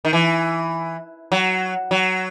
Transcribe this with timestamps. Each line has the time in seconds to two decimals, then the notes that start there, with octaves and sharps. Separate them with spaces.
0.05 D#3
0.13 E3
1.32 F#3
1.91 F#3